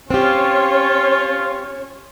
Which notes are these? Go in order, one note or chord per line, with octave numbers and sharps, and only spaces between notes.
C4 C#4 F4 G4 C#5